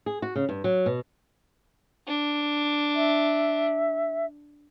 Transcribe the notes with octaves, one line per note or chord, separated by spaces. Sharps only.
G#4
F#4
C#3
G2
F#3
B2
D4
E5